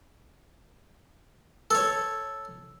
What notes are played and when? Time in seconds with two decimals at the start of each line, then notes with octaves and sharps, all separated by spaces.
1.71 A4 C#5